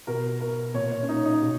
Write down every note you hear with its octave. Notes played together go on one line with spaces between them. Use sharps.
B2 A#4
A#4
A#2 C#5
C#5
C#4
D#4
D#4
B2